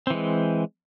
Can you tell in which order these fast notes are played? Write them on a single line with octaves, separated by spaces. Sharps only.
C4 E3 G#3